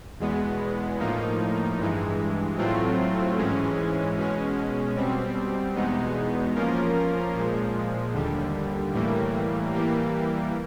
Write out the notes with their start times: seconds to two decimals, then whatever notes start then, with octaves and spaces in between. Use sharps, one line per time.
0.20 E2 B2 G#3 B3
0.99 A2 F3 A#3 D#4
1.78 G2 E3 G#3
2.58 A2 F#3 A3 C4 F4
3.37 G#2 E3 G#3 C#4
4.17 B2 G#3 C#4
4.96 B2 G3 C4
5.75 E2 B2 G#3 B3 D#4
6.55 F3 A#3 C#4 F4 A#4
7.35 A#2 F3 G#3
8.14 D#2 D3 G3
8.93 A2 E3 G3 A#3
9.73 E3 G3 A#3